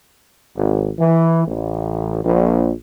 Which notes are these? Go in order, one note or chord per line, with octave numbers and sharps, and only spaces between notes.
G#1
E3
A1
A#1